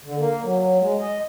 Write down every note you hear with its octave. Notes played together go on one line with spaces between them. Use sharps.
D3
A#3
F#3
G#3
D#5